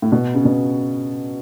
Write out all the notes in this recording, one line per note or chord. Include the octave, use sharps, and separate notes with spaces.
A2
B2
C#3
B2